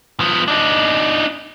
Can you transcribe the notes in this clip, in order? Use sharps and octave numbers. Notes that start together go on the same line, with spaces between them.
F3 B3
D4 D#4